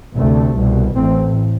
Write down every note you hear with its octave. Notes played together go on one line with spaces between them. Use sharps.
D2 C3 A3
C2 B2
A1 A2 C4